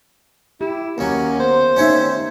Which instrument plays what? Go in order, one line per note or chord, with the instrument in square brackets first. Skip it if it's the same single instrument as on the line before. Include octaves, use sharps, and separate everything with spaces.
[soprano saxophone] E4 [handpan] G4
[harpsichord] D#2 F#3 [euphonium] A#3 [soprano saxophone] C#4
[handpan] B3 [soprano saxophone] C5
[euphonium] D#2 [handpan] A3 D#4 [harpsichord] C#4 C#5 E5